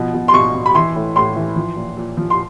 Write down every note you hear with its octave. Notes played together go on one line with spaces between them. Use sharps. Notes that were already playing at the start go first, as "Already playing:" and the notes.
Already playing: B2 F3
B2
C6
B2 C#6
B2
B5
E3 C6
A2
A2 C6
E3
F3
A#2
A#2
F3
C6